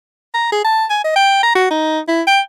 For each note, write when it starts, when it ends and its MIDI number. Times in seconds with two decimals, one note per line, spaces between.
0.34 0.50 82
0.52 0.60 68
0.64 0.84 81
0.90 1.03 80
1.04 1.12 75
1.16 1.38 79
1.43 1.55 82
1.55 1.65 66
1.71 2.00 63
2.08 2.22 64
2.27 2.40 79